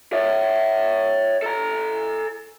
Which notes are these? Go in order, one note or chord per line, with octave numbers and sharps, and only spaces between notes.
C#5 E5
A4 A#5